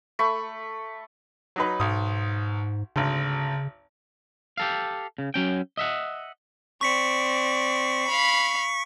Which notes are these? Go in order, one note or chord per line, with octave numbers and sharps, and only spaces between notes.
A3 B5 C#6
F#3 D#4 B4
B1 G#2 D#6
G#1 D2 C#3
G4 A4 F5
C#3
F#3 C#4 G5
D#5 E5 F#5
C4 D5 C#6 B6 C#7
F5 B5